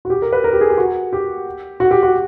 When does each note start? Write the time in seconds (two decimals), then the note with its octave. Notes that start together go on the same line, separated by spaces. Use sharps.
0.05 F#4
0.10 G4
0.22 A#4
0.32 B4
0.44 A#4
0.53 G4
0.61 G#4
0.70 G4
0.78 F#4
1.13 G4
1.80 F#4
1.91 G4
2.03 F#4